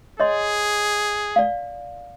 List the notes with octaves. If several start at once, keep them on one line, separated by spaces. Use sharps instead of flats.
G#4 C#5 D#5 C6
D5 F5